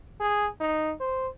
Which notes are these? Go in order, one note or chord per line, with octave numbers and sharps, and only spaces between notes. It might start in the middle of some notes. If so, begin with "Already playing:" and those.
G#4
D#4
C5